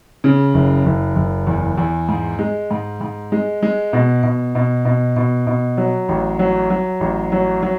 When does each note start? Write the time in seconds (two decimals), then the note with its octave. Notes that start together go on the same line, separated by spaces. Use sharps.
0.24 C#3
0.54 F#1
0.86 F#1
1.16 F#1
1.47 E2
1.78 E2
2.09 G#2
2.39 G#3
2.71 G#2
3.01 G#2
3.32 G#3
3.63 G#3
3.93 B2
4.23 B2
4.55 B2
4.85 B2
5.16 B2
5.47 B2
5.77 F#3
6.09 A1
6.39 F#3
6.70 F#3
7.00 A1
7.32 F#3
7.62 F#3